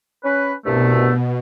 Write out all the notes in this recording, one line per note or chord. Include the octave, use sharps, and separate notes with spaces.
C#4 B4
C2 G2 B2 A3